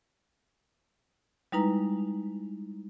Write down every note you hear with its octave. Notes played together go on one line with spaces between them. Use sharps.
G3 G#3 D#4 E4 B4 A#5